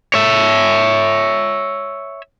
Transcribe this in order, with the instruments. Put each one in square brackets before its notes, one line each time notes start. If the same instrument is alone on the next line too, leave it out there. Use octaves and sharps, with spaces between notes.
[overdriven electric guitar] C#5 E5